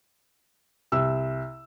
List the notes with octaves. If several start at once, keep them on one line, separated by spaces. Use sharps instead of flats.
C2 E6